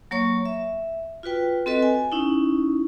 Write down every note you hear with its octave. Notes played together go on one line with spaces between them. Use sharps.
F#3 A#3 C#5 C#6
E5
F4 F#4 B4 G5
C4 F#4 A4 B4 D#5
G#5
C#4 D#4 E4